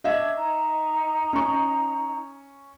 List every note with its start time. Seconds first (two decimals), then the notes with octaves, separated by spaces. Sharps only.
0.04 D4 D#5 E5 C#6 G#6
0.35 D#4 A#5
1.33 C#4 C#6